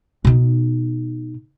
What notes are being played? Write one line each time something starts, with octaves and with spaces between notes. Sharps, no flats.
B2 D#4